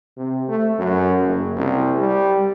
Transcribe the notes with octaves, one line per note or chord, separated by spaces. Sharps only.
C3
A3
F#2
F#1
C2
G3